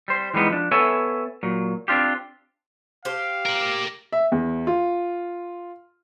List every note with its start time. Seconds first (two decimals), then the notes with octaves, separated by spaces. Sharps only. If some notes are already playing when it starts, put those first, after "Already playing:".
0.08 G3 C5
0.34 E3 G3 G#3 B3 D#4
0.50 F3 D4
0.72 B3 A4 C#5 E5 G#5
1.43 A#2 F#3
1.88 C4 D4 F4 G4
3.05 G4 C5 F5
3.46 A#4 D5
4.12 E5
4.32 E2
4.67 F4